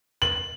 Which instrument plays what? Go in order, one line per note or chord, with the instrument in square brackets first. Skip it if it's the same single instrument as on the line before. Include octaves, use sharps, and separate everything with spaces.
[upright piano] F#7